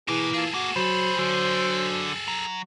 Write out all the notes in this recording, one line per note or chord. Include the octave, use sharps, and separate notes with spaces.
B2 E3 A#3 G#4
F4 G#4 A4
A#3 F#4
C#3 F#3 C5 B5
D3 F#3
F#3